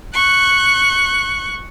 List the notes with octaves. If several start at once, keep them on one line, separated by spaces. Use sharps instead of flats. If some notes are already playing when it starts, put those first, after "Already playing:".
C#6 F#6